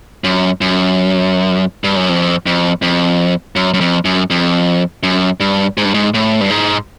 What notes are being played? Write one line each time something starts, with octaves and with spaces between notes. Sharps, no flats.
F#2
F#2
G2
F#2
F2
F2
F2
F#2
F#2
F2
F#2
F2
F#2
G2
G#2
G2
G#2
A2
G2
G#2